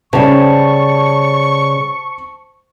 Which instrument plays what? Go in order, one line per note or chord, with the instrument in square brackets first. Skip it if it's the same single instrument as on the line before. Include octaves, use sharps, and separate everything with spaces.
[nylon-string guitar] C#3 G3 [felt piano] C5 A5 [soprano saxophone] C#6